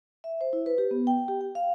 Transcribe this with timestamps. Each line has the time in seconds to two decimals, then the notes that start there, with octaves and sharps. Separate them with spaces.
0.24 E5
0.41 C5
0.53 E4
0.66 B4
0.78 G4
0.91 B3
1.07 G5
1.28 G4
1.41 G5
1.55 F5